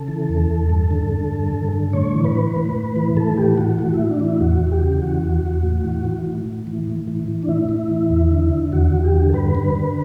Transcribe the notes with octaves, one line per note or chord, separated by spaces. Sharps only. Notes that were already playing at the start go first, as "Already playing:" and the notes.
Already playing: C#3 A4
E3
E2
E2
G2
D3
D3
G2
G2
D3
A2 C#5
E3
B4
E3
A2
A2
E3
A2 A4
E3 G4
E3 F#4
A2 F#4
E4
A2
D4
E3 E4
E2 F#4
E2
G4
C#3
E3 F#4
E2
E2
A2
E3
E3
A2
A2
E3
A2
E3
E3
D4
A2 E4
A2
E3
E2
D3
D3
E2 F#4
E2
G4
D3
A4
G2 B4
D3
D3